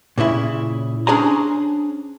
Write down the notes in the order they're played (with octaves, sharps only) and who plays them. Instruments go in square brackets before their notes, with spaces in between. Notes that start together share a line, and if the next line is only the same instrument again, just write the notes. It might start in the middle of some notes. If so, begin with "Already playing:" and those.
[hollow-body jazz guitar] A#2 C#3 E4 E5
C#4 D4 G#4 C5 G#5 A#5